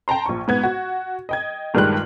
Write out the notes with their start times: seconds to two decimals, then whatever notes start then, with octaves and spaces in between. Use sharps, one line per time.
0.08 G5 A5 A#5 C6
0.26 A#1 C#6
0.48 G#2 B3 G#6
0.63 F#4
1.29 D#5 G5 G#6
1.74 A#1 G2 D#3 G3 G#3 F#6